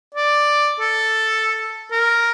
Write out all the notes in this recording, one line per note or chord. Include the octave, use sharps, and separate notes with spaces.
D5
A4
A#4